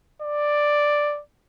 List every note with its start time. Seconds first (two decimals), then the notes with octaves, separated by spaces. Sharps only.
0.22 D5